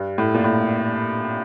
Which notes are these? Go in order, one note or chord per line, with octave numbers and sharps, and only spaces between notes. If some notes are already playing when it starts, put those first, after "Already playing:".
Already playing: G2
A2
A#2
A2